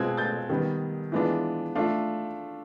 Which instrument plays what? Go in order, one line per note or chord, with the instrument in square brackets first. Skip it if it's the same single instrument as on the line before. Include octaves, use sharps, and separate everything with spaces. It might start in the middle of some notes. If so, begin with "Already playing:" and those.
Already playing: [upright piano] B2 G#3 C4 F4 F#6 G#6
G6 A6
D#3 G3 B3
E3 G#3 B3 D4 F4
A3 D4 F4